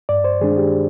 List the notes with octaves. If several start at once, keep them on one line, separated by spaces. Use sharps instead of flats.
G2 D5
C5
D#3 G#3 D4 G#4
G4